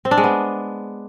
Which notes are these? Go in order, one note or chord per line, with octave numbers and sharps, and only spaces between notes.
C4
D4
G#3
B3